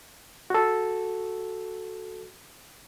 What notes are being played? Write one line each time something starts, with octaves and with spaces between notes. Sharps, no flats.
F#4 A4